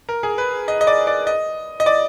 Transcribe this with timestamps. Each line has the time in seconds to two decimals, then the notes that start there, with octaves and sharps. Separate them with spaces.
0.09 A#4
0.23 G#4
0.38 B4
0.68 D#5
0.81 D#5
0.87 D5
1.07 D5
1.27 D#5
1.80 D#5
1.86 D5